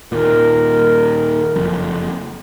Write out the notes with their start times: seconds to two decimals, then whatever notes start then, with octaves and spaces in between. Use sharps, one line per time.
0.12 D#2 A#2 A#4
1.55 F#1 F2